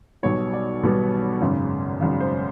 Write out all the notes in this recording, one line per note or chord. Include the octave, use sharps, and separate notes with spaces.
B1 B2 G3 B3 C#5
D5
B1 B2 G3 B3
G#1 F#2 C#3
G#1 F#2 C#3
C5